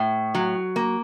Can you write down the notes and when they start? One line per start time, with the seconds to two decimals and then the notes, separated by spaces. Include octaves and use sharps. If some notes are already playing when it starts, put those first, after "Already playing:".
Already playing: A2
0.35 F#3
0.76 A#3